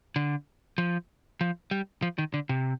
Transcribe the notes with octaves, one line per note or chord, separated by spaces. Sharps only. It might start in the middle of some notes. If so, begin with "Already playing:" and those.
D3
F3
F3
G3
F3
D#3
D3
C3